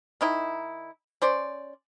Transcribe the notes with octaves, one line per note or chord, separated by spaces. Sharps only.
D#3 D#4 E4
C#4 C5 D5